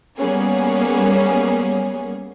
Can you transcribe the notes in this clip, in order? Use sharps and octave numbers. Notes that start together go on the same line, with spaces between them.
G3 A#3 B3 C#4 G#4